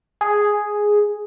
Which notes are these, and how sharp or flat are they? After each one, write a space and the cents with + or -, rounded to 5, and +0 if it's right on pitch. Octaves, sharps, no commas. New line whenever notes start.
G#4 +0